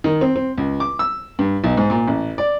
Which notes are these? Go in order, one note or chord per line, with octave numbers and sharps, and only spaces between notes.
D#3
C4
C4
C#2
D6
E6
G2
B1
G#2
A#2
A1
D5